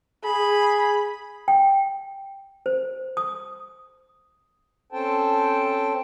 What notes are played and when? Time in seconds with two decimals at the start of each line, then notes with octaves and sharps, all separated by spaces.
0.24 G#4 B5
1.48 G5
2.66 C5
3.17 D#6
4.92 C4 C#4 A4 C5 G5 A5